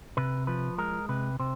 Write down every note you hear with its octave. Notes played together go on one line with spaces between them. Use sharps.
C3 B4
F3 B4
G#3 A#4
C3 B4
C3 C5